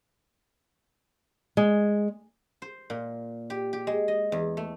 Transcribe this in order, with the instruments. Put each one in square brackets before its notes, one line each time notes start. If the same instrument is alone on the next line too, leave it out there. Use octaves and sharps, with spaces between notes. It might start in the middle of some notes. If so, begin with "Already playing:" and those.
[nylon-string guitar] G#3
[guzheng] C5
A#2
G4
G4
G#3
D#5
E2
A3